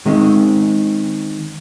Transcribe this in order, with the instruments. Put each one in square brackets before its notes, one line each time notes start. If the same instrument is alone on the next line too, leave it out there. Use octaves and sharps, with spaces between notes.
[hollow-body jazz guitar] D#3 G#3 C4 C#4